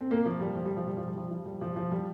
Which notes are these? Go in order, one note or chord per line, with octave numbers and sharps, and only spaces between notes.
C4
A#3
F3
G3
F3
G3
F3
G3
F3
G3
F3
F3
G3
F3
F3
G3